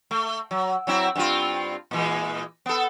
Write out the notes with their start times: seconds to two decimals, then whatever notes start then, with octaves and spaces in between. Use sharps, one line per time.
0.11 A3
0.51 F#3
0.87 F#3 C4 E4
1.15 G2 C4 F4
1.91 A#2 E3 G#3
2.66 B3 A4